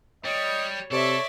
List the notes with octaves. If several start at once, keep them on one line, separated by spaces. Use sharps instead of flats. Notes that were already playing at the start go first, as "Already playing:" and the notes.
G3 C#5 D#5
C3 A4 C#5 D5 E5